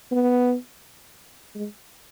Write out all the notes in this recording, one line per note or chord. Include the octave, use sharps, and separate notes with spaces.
B3
G#3